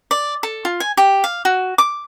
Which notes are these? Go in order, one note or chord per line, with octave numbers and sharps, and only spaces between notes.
D5
A4
F4
G#5
G4
F5
F#4
D6